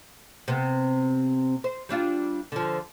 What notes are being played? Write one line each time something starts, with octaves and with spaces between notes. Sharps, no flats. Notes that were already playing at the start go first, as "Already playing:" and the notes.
C3 B3
C5
G3 D4 F4
D3 F3